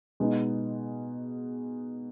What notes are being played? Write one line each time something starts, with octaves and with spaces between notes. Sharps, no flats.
B2 G#3 B3 D#4